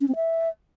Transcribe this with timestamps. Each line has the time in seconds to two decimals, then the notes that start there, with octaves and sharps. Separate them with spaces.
0.01 C#4
0.08 C4
0.16 E5